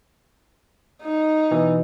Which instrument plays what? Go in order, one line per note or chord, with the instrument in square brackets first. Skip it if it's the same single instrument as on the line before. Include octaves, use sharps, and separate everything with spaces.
[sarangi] D#4
[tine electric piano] B2 E3